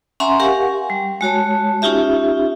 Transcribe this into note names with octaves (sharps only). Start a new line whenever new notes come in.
C#4 E5 F#5 G#5 A#5 C6
G4 A#4 F5 F#5 G#5 C#6
G3
G#3 F#4 C#5 A5
C#4 D#4 F4 G4 E5